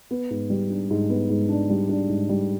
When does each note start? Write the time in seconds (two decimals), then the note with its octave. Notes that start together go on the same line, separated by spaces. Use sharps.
0.11 B3
0.30 G#2
0.50 G3
0.70 D4
0.91 G#2
1.10 B3
1.30 G#2
1.49 D4
1.70 G3
1.89 D4
2.09 G#2
2.29 G3